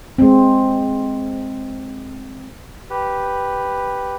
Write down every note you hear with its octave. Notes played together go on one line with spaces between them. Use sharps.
G#3 C4
G4 B4